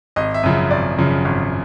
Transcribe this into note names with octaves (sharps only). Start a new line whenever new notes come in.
G#1 D#5
E5
F#2 C#3 F3
G#1 D5
F#2 C#3 F3
G#1